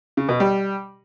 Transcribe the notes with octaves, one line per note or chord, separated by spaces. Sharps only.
C#3
B2
G3